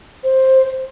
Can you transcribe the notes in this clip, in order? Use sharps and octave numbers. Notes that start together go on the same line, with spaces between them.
C5